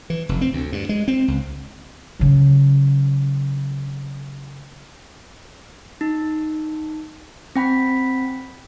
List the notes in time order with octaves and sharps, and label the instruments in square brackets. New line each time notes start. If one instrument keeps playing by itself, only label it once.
[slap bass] E3
F1
C4
D2
G2
G#3
C4
C#2
[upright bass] C#3 F#3
[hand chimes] D#4
C4 G5 B5 B6